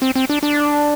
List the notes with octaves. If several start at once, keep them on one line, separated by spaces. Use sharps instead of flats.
C4
C4
D4
D4